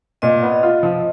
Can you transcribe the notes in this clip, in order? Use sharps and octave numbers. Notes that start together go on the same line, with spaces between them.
A#2 D#5
B3
F4
F3